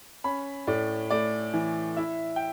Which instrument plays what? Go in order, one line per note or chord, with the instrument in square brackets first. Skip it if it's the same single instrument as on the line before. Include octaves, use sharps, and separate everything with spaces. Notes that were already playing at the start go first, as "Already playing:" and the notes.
[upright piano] C#4 B5
A2 D5
A3 D5
E3
E4 E5
G5